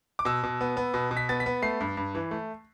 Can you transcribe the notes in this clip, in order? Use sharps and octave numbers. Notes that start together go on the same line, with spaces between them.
D6
B2 E6
B2
B3
B3
B2
B2
B6
B3 A6
B6
B3
A3 C7
G2
G2
E3
A3